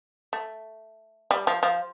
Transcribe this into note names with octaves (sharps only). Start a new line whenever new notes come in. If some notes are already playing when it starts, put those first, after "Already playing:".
A3
G3
F3
F3